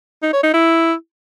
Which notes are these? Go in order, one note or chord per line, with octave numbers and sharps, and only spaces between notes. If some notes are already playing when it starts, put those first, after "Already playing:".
D#4
C#5
D#4
E4